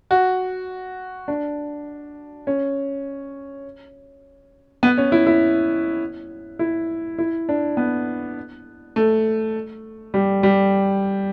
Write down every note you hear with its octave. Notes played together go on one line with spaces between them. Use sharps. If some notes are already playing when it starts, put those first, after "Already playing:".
F#4
D4
C#4
B3
C#4
E4
E4
E4
E4
D4
B3
A3
G3
G3